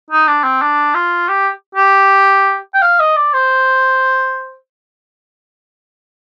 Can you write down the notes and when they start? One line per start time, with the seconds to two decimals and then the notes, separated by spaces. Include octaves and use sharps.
0.11 D#4
0.28 D4
0.44 C4
0.62 D4
0.95 F4
1.29 G4
1.75 G4
2.74 G5
2.82 F5
3.00 D#5
3.16 D5
3.33 C5